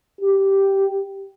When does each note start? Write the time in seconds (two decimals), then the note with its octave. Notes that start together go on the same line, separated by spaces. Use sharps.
0.21 G4